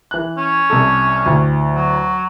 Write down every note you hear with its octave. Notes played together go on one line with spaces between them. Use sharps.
E3 F#6
C#4
C2 A4
D2 A2
F#3